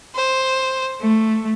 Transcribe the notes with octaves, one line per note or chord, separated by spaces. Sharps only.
C5
A3